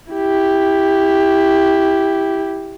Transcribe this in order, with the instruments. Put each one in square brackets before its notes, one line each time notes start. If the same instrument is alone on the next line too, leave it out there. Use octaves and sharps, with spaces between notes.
[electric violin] E4 G4